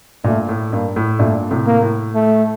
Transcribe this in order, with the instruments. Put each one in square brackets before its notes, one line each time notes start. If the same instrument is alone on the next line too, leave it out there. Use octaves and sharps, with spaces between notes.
[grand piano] G2 A#2 [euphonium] A3
[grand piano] A2
[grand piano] G2 [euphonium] A#3
[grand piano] A2
[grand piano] G2 A#2 [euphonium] A3
[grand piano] A2 C3
[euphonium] A#3
[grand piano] A2
[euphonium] A3